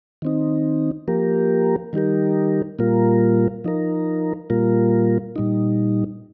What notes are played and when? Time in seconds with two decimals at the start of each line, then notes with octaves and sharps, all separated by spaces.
0.22 D#3 C4 D#4
1.08 F3 A#3 G4 A#4
1.93 D#3 G3 D#4 G4 A#4
2.79 A#2 G3 A#3 F4 A#4
3.64 F3 D#4 A#4
4.50 A#2 G3 A#3 F4 A#4
5.36 A#2 G3 D#4